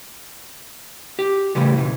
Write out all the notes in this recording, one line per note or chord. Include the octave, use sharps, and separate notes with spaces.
G4
A2 C#3 E3 G3
B1 F#2 E3